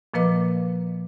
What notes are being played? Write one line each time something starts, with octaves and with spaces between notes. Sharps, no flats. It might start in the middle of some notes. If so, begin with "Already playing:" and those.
A#2 F3 A#3 B4 D#5 D6